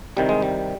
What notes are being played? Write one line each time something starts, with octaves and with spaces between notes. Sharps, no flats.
C2 C3 D#3 G3
G#3
G3